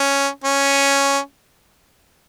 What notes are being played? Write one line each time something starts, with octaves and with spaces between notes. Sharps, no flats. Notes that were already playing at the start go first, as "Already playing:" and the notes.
Already playing: C#4
C#4